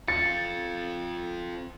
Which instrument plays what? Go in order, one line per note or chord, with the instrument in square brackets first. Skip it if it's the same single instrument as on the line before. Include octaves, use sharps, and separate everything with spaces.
[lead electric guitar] C4 F4 [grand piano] A6 [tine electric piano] C#7